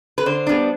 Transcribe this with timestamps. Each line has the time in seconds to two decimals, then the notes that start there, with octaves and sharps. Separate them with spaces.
0.18 B4
0.26 D3 C5
0.47 G3 B3 D4